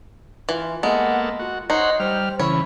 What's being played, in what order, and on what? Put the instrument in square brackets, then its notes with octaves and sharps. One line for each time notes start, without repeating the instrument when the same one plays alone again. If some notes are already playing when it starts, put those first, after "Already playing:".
[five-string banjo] E3 [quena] F4
[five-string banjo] G#3 [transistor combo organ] A#3 B3 A4 [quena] F#5
[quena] F4 [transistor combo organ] F#4
[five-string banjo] D#4 [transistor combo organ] C5 C#5 F#5 [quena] D#5
[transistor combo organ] G3 F6 [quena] C5
[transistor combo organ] C#3 E3 [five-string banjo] C#5 [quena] B5